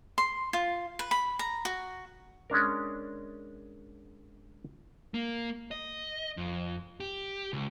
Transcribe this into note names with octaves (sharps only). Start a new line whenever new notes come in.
C6
F4
B4
B5
A#5
F#4
G#3 C#4 D4 A#4
A#3
D#5
F2
G4
C#2